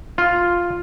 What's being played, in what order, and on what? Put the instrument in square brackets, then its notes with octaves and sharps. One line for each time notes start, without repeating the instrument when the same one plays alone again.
[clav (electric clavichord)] F4